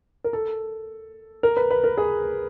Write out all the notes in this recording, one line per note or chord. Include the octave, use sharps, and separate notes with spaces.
A#4
A4
A#4
B4
B4
A#4
G#4